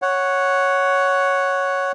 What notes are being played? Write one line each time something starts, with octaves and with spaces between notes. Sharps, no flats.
C#5 F#5